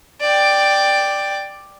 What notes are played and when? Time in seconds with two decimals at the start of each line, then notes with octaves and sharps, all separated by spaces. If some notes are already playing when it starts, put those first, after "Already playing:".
0.21 D5 G5